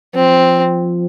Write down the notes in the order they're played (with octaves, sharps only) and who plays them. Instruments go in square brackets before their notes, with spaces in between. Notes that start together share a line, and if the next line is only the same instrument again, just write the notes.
[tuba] F3 [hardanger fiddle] C4